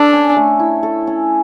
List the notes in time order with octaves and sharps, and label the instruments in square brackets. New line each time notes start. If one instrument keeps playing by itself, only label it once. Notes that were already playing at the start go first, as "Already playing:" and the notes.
Already playing: [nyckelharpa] D4 [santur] A4
[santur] C#4
A3
E4
A4
C#4